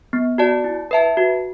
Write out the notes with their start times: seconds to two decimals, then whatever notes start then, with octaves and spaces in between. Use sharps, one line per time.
0.13 B3
0.38 F#4 D5 A5
0.64 E4
0.91 B4 E5 A5
1.17 F#4